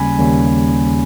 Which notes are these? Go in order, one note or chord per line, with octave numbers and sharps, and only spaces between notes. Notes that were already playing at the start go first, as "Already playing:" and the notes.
Already playing: D#2 C#3 G3 A#3 C#4 G#5 B5
D#2 C#3 G3 A#3 C#4